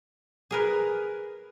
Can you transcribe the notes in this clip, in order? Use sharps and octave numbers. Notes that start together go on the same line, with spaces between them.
G#4 A#4 B4